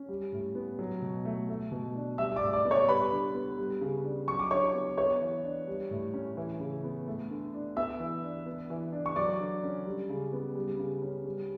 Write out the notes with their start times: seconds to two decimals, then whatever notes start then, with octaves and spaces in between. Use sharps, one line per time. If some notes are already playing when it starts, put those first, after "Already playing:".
Already playing: C#4
0.09 G3
0.33 A2
0.55 B3
0.79 F#3
1.02 B2
1.25 A3
1.49 A3
1.72 B2
1.95 D4
2.18 G3 E5 E6
2.36 D5 D6
2.42 A2
2.53 D5 D6
2.65 B3
2.71 C#5 C#6
2.88 G3 B4 B5
3.12 D3
3.35 B3
3.58 G3
3.81 C#3
4.04 D4
4.28 F#3 C#6
4.39 D6
4.51 D3 C#5 C#6
4.74 B3
4.97 B3 C#5 C#6
5.21 E3
5.44 D4
5.68 G3
5.91 A2
6.14 C#4
6.37 E3
6.60 C#3
6.84 B3
7.07 A3
7.30 D3
7.54 D4
7.77 B3 E5 E6
8.00 E3
8.23 D4
8.46 B3
8.70 E3
8.92 D4
9.06 C#6
9.16 F#3 D5 D6
9.40 D3
9.63 C#4
9.86 G3
10.09 C#3
10.33 B3
10.55 G3
10.79 C#3
11.02 C#4
11.25 G3